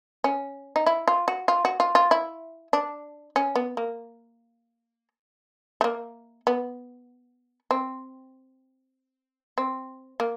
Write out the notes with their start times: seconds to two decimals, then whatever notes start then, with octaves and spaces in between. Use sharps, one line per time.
0.24 C#4
0.76 D#4
0.86 E4
1.08 F4
1.28 F#4
1.48 F4
1.65 F#4
1.80 F4
1.95 F4
2.11 E4
2.73 D4
3.36 C#4
3.55 B3
3.77 A#3
5.81 A3
5.84 A#3
6.47 B3
7.71 C4
9.58 C4
10.20 A#3